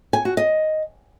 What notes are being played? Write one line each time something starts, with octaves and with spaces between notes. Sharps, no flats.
G#5
F#4
D#5